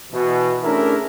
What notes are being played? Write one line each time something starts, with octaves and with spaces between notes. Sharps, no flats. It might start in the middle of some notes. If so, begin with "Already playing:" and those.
B2 E3
A3 C#4 D4 E4 G#4 A#4